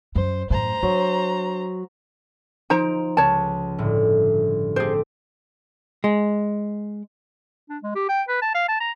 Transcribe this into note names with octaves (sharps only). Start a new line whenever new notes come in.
F#2 C5
F#2 A2 C5 A#5
F#3 D4
F3 D#4 C5 A#5 D7
C#2 C#5 A5
G1 A2
A3 C4 G4 G#4 C5
G#3
D4
G#3
G4
G5
B4
A5
F5
A5
A#5